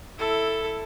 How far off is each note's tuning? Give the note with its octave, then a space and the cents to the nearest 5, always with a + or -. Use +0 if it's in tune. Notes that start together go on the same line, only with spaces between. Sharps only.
E4 +0 A4 +5